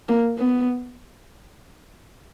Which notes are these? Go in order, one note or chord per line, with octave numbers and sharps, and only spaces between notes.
A#3
B3